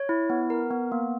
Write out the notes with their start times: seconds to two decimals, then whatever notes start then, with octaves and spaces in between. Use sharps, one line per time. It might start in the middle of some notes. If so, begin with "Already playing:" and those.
Already playing: C#5
0.09 E4
0.30 B3
0.50 A#4
0.71 B3
0.92 A#3